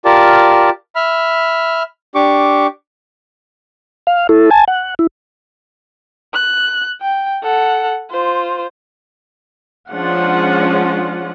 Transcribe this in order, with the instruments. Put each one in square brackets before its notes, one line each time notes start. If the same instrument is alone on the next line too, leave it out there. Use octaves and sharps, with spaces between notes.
[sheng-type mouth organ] F4 G4 A#4 D5 A5
E5 B5 F6
D4 G4 C#6 D6
[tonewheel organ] F5
E4 A4
G#5 A5
F#5
E4
[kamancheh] F#6
G5
A4 F#5
F4 C5
[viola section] F3 G#3 C#4 D4 F4 F#5